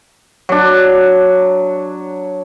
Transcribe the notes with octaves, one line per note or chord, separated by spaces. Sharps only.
F#3 D4